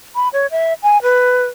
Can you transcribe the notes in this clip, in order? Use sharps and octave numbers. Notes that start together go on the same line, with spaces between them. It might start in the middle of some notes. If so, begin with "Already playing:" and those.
B5
C#5
E5
G#5
B4